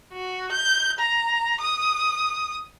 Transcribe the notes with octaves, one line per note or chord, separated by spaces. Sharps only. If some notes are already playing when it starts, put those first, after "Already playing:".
F#4
G6
A#5
D#6